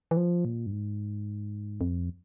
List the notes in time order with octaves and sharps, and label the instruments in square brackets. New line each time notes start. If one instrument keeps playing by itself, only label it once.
[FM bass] E3
F3
A#2
G2
G#2
F2